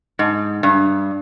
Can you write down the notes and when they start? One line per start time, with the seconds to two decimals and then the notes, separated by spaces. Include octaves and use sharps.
0.19 G#2
0.63 G2